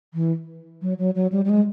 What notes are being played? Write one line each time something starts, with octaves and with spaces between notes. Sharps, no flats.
E3
F#3
F#3
F#3
G3
G3
G#3